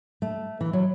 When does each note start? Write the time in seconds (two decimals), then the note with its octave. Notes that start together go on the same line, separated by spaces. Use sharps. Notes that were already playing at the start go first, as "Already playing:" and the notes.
0.22 A3
0.61 E3
0.73 F#3